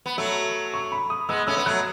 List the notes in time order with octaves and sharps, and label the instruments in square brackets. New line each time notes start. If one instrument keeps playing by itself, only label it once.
[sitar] B3
[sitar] F#3 A3 [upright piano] E6
[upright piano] C#6
B5
D#6
[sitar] G#3 B3 [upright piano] E6
[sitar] A3 C#4 [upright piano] E6
[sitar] B3
[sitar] F#3 A3 [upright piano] F#6